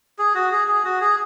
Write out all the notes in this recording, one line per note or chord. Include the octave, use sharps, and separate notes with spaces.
G#4
F#4
G#4
G#4
F#4
G#4